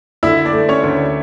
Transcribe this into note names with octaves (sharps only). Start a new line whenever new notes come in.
D3 E4 E5
D4 D5
A3
C#4 C#5
D2